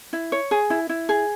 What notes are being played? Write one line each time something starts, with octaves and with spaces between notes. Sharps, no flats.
E4
C#5
G#4
E4
E4
G#4